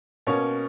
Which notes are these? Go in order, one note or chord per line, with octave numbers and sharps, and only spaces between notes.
B2 A#3 C#4 C#5